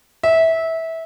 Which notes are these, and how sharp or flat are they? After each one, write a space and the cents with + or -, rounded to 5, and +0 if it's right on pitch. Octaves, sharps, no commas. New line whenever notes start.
E5 -20